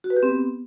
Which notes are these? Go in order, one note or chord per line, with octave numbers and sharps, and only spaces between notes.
F#4
B4
G4
C4
B3